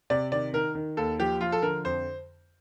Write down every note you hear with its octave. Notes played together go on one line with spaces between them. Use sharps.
C3 D5
D#3 D5
D#3 A#4
D#3
D#2 A4
F3 G4
F3 F4
A4
D3 A#4
F2 C5